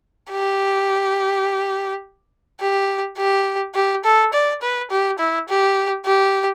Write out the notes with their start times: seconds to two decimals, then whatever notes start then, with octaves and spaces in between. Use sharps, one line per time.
0.31 G4
2.60 G4
3.17 G4
3.75 G4
4.04 A4
4.33 D5
4.62 B4
4.91 G4
5.18 E4
5.48 G4
6.05 G4